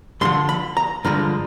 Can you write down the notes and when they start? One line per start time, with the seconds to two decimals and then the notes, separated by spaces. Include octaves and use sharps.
0.21 G2 D3 F3 C6
0.49 B5
0.77 A#5
1.05 G2 D3 F3 G#3 A#5